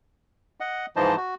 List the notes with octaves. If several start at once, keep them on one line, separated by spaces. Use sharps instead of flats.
D#5 F#5
G#2 E3 F3 C5 D#5 A5
F#4